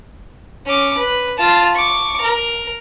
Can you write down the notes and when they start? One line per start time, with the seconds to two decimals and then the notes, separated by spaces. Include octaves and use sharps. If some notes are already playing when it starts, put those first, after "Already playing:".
0.66 C#4 D6
0.97 B4
1.37 F4 A5
1.74 C#6 D6
2.21 A#4